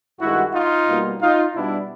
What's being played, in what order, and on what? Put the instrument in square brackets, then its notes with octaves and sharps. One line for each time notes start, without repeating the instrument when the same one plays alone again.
[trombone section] G2 D#3 G#3 E4 F#4
D#4 F4
B2 G3 A#3
D#4 F4
B2 G3 B3 D4 E4